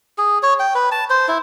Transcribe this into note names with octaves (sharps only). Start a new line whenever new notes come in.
G#4
C#5
G5
B4
A5
C5
E4